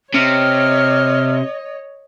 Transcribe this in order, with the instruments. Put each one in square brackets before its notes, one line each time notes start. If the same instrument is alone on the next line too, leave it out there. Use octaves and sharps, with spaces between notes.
[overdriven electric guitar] C3 [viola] C#5 D#5 [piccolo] F6